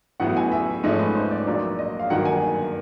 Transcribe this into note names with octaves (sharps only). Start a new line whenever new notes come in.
A1 A2 F#3 B3 F#5
G#5
E5
G#2 F3 A3 C#4 D#5
B4
C5
D5
A#1 A#2 F#3 A#3 D4
D#5
F5
G1 G2 D#3 F#3 A#3 F#5
G#5